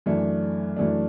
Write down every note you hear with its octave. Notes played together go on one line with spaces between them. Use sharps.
F#2 E3 A3 D4
F#2 E3 A3 D4